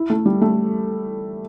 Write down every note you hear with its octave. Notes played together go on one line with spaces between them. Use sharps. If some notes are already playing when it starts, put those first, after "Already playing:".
Already playing: E4
A3
G3
A3